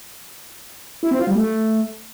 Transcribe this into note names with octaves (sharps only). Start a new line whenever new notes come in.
E4
C4
F4
G3
A3